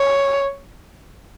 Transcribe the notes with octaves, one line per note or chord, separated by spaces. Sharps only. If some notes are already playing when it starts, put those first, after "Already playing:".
Already playing: C#5